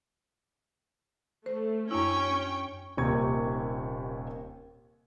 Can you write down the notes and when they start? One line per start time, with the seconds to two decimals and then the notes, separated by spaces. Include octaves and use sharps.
1.46 A3 C5
1.91 F#2 C#4 D4 E4 G5 C#6
2.97 D#1 D#2 C3 C#6 G#6